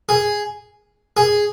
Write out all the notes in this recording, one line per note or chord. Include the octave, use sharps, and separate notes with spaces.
G#4
G#4